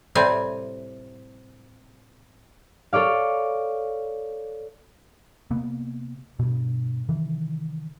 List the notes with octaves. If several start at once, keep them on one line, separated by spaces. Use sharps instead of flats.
A2 C3 G3 C4 G#5
A4 C#5 D5 F5
C3 A#3 B3
G2 B2
C3 D#3 E3